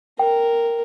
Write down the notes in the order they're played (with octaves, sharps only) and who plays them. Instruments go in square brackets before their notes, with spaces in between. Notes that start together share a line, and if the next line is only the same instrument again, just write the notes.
[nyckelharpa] A#4 [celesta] G5